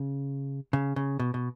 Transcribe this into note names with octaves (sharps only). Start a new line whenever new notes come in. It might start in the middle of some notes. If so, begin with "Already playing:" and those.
Already playing: C#3
C#3
C#3
B2
B2